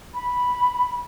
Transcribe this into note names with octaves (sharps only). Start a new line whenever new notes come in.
B5